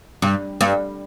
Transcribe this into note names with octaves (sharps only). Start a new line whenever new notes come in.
G2
G2